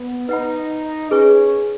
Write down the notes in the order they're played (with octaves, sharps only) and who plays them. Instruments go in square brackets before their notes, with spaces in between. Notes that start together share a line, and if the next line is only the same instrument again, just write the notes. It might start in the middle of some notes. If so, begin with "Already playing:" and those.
Already playing: [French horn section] B3
[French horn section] D#4 [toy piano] B4 F#5 B5
[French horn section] C#4 [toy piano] G#4 B4 G#5 C#6